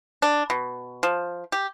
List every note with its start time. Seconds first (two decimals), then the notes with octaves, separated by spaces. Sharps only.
0.22 D4
0.50 B2
1.03 F3
1.52 G4